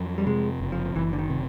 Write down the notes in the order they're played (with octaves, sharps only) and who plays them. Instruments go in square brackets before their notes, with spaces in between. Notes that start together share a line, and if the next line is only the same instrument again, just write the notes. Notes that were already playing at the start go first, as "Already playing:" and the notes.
Already playing: [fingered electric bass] F2 F#3
[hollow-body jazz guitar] G3
[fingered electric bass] C3 [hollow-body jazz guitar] G#3
[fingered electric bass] F#1
[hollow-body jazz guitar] F3
[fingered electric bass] F#1 [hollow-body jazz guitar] E3
[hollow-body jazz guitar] D3
D#3
[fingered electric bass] C3